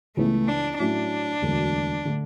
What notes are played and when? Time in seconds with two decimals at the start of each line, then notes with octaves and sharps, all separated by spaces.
0.16 C#2 C#3 E3 A3 B3
0.48 D4
0.79 A2 F#3 C#4 D4
1.42 E1 D2 D3 F#3
2.05 D3 A3